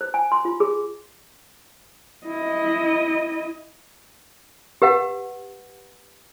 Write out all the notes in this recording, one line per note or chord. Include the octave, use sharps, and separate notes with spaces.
C5
G#5
C6
F4
G#4
E4 D#5
G4 B4 F#5